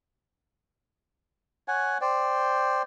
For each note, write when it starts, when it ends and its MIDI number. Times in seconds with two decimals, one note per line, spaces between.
1.68 1.98 73
1.68 1.98 78
1.68 1.98 80
2.01 2.82 72
2.01 2.82 74
2.01 2.82 79